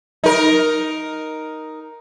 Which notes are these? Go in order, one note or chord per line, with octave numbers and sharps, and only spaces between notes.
D#4 A#4